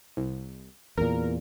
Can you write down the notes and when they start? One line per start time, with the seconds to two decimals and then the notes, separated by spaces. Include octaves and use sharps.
0.17 C2
0.98 E2 A#2 A#4